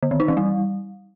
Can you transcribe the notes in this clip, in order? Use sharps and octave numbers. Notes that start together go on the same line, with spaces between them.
D3
D#3
D#4
E3
G3